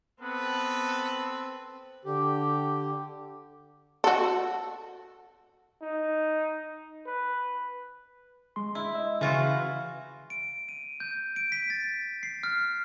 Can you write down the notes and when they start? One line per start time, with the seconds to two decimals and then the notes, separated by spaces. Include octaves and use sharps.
0.21 B3 C4 A4 B4
2.05 D3 G4
4.04 F#4 A4
5.82 D#4
7.06 B4
8.56 G#3 C6
8.75 E4
8.95 D#5 E6
9.21 C#3 E3 F4 F#4
10.30 D7
10.69 D#7
11.00 G6
11.36 D7
11.52 B6
11.70 A6
12.23 C7
12.43 F6